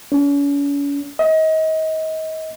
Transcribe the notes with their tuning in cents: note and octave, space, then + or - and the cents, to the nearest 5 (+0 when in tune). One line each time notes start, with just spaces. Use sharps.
C#4 +40
D#5 +30